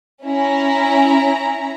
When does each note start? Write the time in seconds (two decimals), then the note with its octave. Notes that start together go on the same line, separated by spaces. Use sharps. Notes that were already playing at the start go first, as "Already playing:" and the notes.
0.23 C#4 E4 A#5